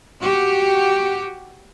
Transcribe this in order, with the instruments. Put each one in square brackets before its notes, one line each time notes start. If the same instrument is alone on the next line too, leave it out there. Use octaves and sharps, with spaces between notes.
[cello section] F#4 G4